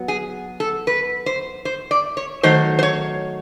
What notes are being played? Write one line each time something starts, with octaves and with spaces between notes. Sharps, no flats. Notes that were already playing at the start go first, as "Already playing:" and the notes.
Already playing: F#3 B3
G#4
A4
B4
C5
C5
D5
C#5
D#3 F#3 A3 C5
C5
C#5